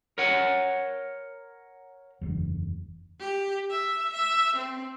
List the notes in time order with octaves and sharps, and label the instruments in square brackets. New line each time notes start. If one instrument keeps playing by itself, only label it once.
[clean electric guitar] A#4 C#5 F#5
[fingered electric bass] F#1 E2
[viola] G4
E5
E5
C4